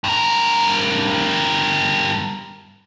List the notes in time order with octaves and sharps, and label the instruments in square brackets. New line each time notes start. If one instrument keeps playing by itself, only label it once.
[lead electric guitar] G2 A#4